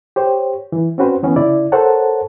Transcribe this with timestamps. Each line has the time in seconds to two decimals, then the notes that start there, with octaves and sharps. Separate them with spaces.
0.16 G4 C5 C#5
0.72 E3
0.98 C4 C#4 F#4 B4 C5
1.23 E3 B3 C#4
1.36 C#3 E4 D5
1.72 A4 A#4 C5 C#5 F#5 A5